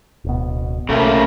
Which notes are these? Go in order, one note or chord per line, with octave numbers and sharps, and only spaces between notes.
D1 B2
B1 C#3 A3 A#3